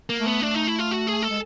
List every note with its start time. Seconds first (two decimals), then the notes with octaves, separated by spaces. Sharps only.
0.10 A#3
0.18 A3
0.26 B3
0.42 A3 D4
0.54 D#4
0.67 E4
0.79 F4
0.91 F#4
1.07 G#4
1.23 A4
1.30 G#3